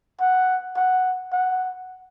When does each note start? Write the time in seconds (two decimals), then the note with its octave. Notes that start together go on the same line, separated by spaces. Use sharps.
0.21 F#5
0.76 F#5
1.32 F#5